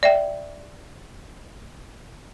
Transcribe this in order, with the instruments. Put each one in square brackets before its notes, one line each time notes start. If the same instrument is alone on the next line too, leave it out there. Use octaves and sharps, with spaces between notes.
[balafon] D5 E5 G5